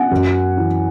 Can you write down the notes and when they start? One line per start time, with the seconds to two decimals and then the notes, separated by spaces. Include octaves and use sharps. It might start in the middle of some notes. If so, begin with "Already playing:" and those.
Already playing: F#5 G#5
0.11 F#2
0.57 E3